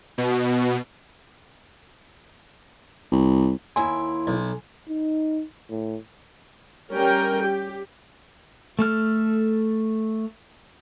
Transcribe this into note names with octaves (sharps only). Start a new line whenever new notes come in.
B2
C2
D#2 E4 G5 G#5 C6
B1
D#4
A2
G3 C#4 A#4 G5
G4
A3 A4 F6